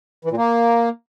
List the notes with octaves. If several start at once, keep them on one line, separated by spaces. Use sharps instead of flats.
E3
A#2
A#3